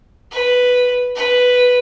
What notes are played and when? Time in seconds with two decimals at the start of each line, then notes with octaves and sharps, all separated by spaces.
0.32 B4
1.15 B4